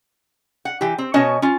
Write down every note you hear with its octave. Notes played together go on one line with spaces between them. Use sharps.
F#5
E3 G4
C4
B2 C#4 C#5 D#5 A5
C#4 F4